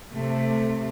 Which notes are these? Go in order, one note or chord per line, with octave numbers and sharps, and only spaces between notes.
C3 A3